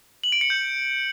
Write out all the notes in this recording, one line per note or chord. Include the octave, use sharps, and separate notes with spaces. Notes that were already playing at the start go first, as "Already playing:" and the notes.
F#7
D7
C#7
G6